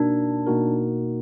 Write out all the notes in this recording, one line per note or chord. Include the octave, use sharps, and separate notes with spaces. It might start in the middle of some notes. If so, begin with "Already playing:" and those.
Already playing: B2 A#3 D4 D#4 F#4 A#4
B2 A#3 D#4 F#4 A#4